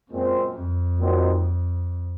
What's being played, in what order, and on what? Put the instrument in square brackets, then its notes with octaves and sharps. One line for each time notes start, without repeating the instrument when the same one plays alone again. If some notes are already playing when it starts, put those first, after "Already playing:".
[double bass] F#2 [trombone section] A#2 G#3 C4
[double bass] F2
[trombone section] A#2 F#3 C4 D#4